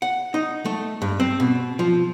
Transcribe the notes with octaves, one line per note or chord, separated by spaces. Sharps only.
F#5
D#4
A3
G2
C4
B2
F3